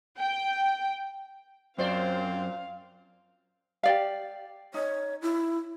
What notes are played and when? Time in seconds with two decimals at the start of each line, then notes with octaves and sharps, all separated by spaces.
0.18 G5
1.78 F#2 A#2 C4 C5 D5 F5
3.83 G4 D5 F5
4.74 D#4 C#5
5.22 E4